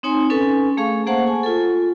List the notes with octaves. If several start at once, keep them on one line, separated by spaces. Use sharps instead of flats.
C4 D#4 C#5 G#5 C6
C#4 A4 B4 G#5
A3 G#4 F5 C#6
A#3 G#4 C5 F#5 A5 C#6
G#5
F4 A4